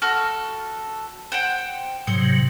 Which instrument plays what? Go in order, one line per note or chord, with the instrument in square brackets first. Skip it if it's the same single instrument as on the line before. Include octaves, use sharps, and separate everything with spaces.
[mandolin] F#4 A4 F6
C5 F#5 G5
[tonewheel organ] G#2 C3 F#3 [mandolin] C5